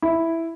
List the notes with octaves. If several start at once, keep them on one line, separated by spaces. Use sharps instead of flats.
E4